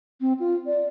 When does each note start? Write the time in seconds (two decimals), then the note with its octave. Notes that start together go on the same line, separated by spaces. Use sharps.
0.21 C4
0.40 F4
0.67 D5